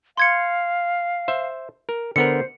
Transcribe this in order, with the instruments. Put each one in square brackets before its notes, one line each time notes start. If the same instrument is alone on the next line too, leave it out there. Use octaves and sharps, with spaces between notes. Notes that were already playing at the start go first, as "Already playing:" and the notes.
[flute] F5 [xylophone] C6 G#6 C#7
[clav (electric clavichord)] C5 E5
A#4
[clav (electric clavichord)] D3 B3 A#4 [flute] C5 [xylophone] C#7